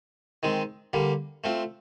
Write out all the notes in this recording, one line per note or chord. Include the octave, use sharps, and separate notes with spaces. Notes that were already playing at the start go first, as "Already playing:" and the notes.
D#3 G#3 C4
D3 G3 A#3
A3 C4 F4